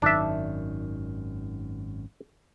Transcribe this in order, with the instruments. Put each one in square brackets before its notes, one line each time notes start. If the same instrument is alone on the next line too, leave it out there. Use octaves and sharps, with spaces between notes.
[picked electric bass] G#1 F#2 D#3 [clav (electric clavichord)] D4 E5